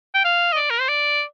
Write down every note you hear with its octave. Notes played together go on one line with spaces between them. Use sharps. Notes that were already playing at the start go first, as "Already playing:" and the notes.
G5
F5
D#5
D5
A#4
C5
D5